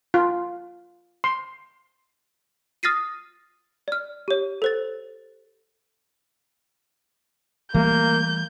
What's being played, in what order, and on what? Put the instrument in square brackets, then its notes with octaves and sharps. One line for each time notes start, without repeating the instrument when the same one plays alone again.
[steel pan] F4
C6
[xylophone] D#6 F6 A6 A#6 C7 D#7
D5 F6
G4 C#5
A4 C5 A6
[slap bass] E3 G3 A3 [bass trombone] A#3 [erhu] G6